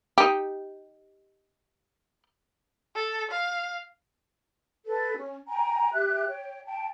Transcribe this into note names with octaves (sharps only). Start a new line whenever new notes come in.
D#4 G4
A4
F5
A4 B4
C#4
G5 G#5 A#5
G4 E5 F#6
C#5 G5
G5 A5